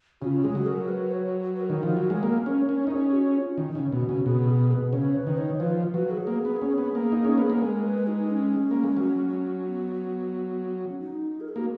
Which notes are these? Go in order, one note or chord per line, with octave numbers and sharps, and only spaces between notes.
C#3 F4 F#4
G#3 G#4
F#3
A#4
B4
C#5
B4
A#4
D#3
F3
F#3
G#3
A#3
C#4
C#4
D#4
C#4 G#4
F#4
F4
D#3
C#3
B2 F#4
C#3
B2 G#4
G#4
B4
C#3 C#5
B4
D#3
C#5
F3 B4
F#3 B4
G#4
A#3
B3
C#4
B3
A#3
D#4
C#4
B3
A#3
B4
G#3 A#4
B4
D#4
C#4
A#3
G#3
F#3
B3
C#4
D#4
A#4
G#4
A#3 F#4